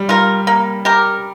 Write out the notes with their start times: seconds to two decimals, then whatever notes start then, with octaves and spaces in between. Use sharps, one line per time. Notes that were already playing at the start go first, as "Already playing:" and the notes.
Already playing: G3
0.09 F4 A#4
0.47 A#3
0.85 G4 A#4